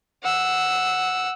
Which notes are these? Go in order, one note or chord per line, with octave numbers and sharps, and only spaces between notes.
F#5 E6